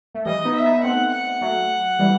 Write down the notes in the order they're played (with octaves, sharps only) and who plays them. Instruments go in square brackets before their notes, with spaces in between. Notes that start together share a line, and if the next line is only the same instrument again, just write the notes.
[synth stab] A3
[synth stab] E3 G3 [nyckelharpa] D#5
[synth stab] B3 D#4
[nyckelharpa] E5
[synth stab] B3 D#4
[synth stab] A3 C4 [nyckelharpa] F#5
[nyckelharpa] F#5
[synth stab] F#3 A3
E3 G3